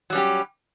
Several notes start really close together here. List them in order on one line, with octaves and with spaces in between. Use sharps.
F#3 G3 C#4 G4